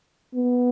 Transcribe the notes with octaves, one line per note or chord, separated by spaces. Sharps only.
B3